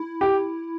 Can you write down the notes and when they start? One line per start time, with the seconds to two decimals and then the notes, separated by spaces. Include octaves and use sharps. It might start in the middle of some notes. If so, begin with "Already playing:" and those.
Already playing: E4
0.21 G4